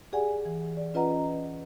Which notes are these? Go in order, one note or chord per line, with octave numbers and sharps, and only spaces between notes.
G4 G#4 D5 F#5 G#5
E3
D5
C#4 F4 B4 D#5 F#5 A#5